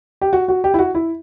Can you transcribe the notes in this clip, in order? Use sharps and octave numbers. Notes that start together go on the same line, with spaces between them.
G4
F#4
F#4
G4
E4
F#4
E4